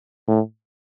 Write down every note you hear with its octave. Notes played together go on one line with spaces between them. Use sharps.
A2